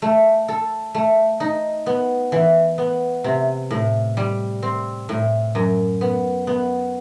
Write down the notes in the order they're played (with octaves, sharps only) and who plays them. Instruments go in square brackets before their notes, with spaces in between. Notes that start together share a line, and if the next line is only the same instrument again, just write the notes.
[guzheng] A3
A4
A3
D#4
B3
E3
B3
C3
A2
G3
C4
A2
F#2
B3
B3